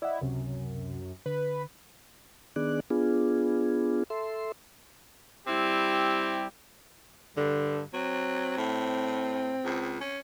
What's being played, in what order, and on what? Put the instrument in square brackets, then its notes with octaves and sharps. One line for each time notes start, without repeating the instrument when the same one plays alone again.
[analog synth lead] E4 [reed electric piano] D5 D#5 F#5
[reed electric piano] C#2 C3 [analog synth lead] F#2
[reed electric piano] D3 [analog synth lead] B4
[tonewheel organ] D#3 B3 D4 G#4 D5 F#6
B3 D4 F4 G#4
A4 E5 C6
[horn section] G3 C4 E4 G4
[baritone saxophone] G2 [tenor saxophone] D3
[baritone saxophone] F#3 [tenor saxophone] C4
[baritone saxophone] A2
C#2
C#4